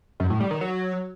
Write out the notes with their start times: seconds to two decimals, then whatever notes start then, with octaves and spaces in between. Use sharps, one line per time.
0.20 F#2
0.30 A2
0.40 G3
0.51 D#3
0.61 F#3